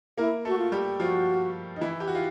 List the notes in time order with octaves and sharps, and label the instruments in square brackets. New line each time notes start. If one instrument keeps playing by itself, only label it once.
[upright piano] A#3 A#4 [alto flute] E4
[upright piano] A3 A4 [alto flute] F#4
[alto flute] F4
[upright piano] G3 G4
[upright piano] F3 F4 [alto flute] F#4
[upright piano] D#4
E3 E4
G4
F#4
F4